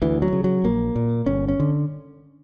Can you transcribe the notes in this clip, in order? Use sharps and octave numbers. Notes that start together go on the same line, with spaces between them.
D2 E3
F#3
C#3
F#3
A#1 A#3
A#2
G1 C#4
C#4
D3